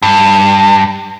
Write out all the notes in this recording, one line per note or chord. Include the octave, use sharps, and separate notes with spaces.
G2